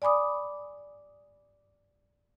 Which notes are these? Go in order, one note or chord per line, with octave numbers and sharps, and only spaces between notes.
D5 G#5 B5 D6 D#6